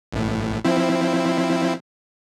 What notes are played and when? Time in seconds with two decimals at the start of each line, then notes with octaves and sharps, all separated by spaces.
0.13 A1 A2
0.65 F3 C4 E4